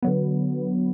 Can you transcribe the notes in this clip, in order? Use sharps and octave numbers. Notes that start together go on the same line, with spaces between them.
D3 F#3 B3